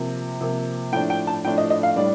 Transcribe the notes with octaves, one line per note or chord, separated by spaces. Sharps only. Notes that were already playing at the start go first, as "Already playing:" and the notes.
Already playing: C3 F3 A#3
C3 F3 A#3
A2 F3 A3 D4 G5
G5
A5
A2 F3 A3 D4 G5
D#5
D#5
F5
A2 G3 D4 D5